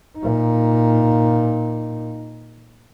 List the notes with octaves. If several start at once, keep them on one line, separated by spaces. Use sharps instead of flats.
A#2 D#4